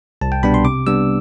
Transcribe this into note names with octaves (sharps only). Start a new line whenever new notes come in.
C2 A5
G5
B2 G3 B3 D4 B5
C6
C3 D6
G3 B3 D4 E6